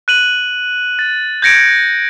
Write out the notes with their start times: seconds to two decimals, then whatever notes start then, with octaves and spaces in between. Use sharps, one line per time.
0.08 F#6 D#7 F#7
0.99 A6
1.42 G6 G#6 A#6 C#7 D7